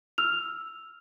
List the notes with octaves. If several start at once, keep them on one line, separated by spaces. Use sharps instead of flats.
E6 F6 F7